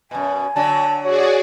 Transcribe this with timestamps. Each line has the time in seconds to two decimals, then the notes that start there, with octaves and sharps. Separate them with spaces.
0.11 F#2 B2 G#5
0.56 D3 F#3 D4 A5
1.03 F#4 G#4 C#5 D5